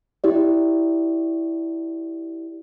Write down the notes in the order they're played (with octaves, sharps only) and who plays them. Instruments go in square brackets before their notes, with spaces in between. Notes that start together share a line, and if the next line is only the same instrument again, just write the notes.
[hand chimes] E4 G4 D5